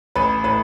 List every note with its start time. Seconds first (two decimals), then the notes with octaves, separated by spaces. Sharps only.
0.16 A1 B4
0.44 A2 B4